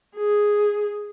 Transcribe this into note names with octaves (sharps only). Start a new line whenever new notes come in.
G#4